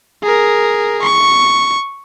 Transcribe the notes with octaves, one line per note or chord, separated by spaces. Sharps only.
G#4 A#4
C#6